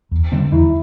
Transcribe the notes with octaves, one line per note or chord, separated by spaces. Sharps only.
E2
D3 G3 C4
E2 E4